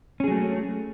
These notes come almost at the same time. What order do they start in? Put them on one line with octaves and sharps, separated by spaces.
C#4 G#4 F#3 A3